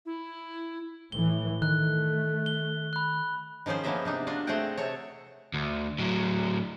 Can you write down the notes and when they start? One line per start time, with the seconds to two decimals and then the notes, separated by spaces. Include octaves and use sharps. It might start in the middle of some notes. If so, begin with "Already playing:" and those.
0.06 E4
1.12 A2 E3 G7
1.62 D#3 A3 F#6
2.46 G7
2.93 B5 F#6
3.66 D#3 F3 C#4 G#4 C5
3.84 F3 A#3 B3 C#4 D#5 E5
4.05 C3 D4 D#4
4.27 D4 F4 F#4
4.47 A3 C4 G#4 D#5 F#5 G5
4.78 C3 A4 C#5
5.54 D2
5.99 A2 F#3